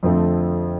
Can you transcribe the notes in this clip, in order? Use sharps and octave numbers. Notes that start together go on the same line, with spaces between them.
F2 D3 F3 A3 C4